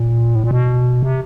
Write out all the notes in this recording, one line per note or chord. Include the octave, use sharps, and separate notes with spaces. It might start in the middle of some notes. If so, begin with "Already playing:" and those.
Already playing: A#2
A2
A#2
B2
C3